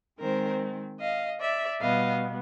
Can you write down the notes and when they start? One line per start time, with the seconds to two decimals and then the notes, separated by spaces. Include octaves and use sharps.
0.21 D#3 G#3 C4 A#4 C5
1.00 D#5 F5
1.40 D5 E5
1.81 B2 G3 B3 D#5 F5